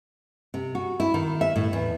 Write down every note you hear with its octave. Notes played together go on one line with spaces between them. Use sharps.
C3
F#4
E4
D#3
E5
A2
E2